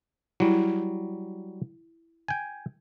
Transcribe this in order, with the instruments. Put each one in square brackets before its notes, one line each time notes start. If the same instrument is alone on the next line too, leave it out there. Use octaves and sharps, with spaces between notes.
[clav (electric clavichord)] F#3 G3 [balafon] E4
[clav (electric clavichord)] G5 G#5